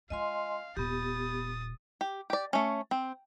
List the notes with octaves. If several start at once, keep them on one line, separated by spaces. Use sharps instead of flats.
G#3 F4 D#5 F5 G#5 C6
D#1 A#2 B3 G4 D#6 A6
G4
G4 D5
A3 C#4
C4